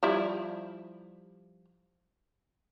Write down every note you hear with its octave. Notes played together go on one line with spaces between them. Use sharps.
F3 G3 E4